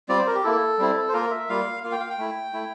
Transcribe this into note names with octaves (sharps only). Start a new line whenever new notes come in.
G3 C4 F4 D5
C5
A#4
G4
A#3 E4 A4
G3 C4 E4
C5
A#3 F4 A#4
E5
G3 A#3 F4 F5
A#3 F4 F5
G5
F5
G5
A3 E4
A3 E4